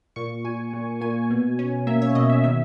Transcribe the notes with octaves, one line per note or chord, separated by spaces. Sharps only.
A#2 C#6
A#2 G#5
A#2
A#2 G#5
B2
C#4
A#3 E5
C#5
B2 D#5
E5
D#3 E5